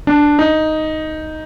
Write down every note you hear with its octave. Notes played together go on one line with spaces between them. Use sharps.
D4
D#4